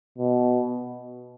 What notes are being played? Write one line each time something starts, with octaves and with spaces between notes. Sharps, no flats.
B2